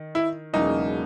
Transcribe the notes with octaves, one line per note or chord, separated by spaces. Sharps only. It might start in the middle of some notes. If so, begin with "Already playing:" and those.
Already playing: D#3
E4
E1 E2 C#3 F#3 A#3 D#4